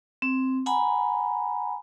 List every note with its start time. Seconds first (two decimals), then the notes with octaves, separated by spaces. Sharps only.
0.22 C4
0.66 F#5 G#5 A#5 B5